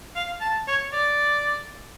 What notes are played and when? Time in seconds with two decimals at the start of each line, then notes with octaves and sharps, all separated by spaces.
0.16 F5
0.41 A5
0.68 C#5
0.93 D5